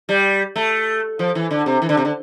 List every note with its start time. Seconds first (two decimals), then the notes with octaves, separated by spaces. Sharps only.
0.09 G3
0.56 A3
1.19 F3
1.35 E3
1.51 D3
1.66 C3
1.82 E3
1.89 D3
1.97 C3
2.05 D3